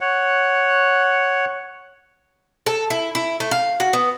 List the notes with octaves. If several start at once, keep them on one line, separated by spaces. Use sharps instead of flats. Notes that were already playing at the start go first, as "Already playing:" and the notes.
C#5 F#5
A4
E4
E4
A3
F5
F#4
B3